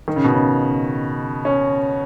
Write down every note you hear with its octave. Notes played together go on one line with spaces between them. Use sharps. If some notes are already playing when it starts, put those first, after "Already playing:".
D#3
C#3
B2
C#3
C#4